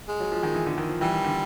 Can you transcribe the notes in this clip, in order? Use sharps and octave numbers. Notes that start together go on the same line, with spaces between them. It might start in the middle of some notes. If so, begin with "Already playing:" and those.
G#3
F#3
F3
D#3
E3
D3
D#3
F3
E3 G3
D#3
D3